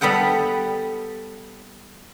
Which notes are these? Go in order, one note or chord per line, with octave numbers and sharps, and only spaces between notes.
G3 B3 A4 F#5 G5